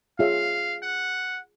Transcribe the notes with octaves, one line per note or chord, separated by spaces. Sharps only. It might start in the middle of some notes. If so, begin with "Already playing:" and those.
F4 G#4 C#5 E5 F5
F#5